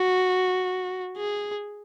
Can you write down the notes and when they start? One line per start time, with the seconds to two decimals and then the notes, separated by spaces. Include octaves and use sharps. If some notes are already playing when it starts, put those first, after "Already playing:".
Already playing: F#4
1.17 G#4